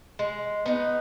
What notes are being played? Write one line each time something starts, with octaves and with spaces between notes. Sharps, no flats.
G#3
B3 D#4